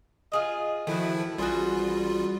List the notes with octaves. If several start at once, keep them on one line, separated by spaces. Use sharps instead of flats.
F4 G#4 D#5
D#3 F3 A3 E4 F#4
A3
A1 G3 F4 F#4 G#4 C5